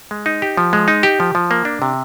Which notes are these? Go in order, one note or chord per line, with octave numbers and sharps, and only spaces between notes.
G#3
D#4
G4
F3
G#3
D#4
G4
F3
F3
A#3
D4
C3